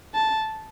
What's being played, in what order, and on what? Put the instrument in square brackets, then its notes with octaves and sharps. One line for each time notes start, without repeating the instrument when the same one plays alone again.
[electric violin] A5